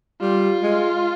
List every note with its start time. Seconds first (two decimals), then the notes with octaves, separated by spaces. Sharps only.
0.21 G3 F4
0.63 G#3